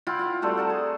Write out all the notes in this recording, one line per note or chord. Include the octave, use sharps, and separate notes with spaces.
E4 F4 F#5 G5
F4 F5
G3 A3 C4 F#4
F#5 A5 A#5
G#4